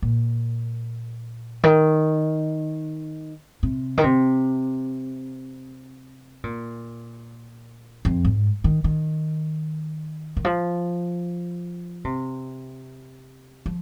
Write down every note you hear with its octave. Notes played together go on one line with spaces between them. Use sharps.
A#2
D#3
C3
D#3
C3
A#2
F2
G#2
D#3
D#3
D#3
F3
C3
F3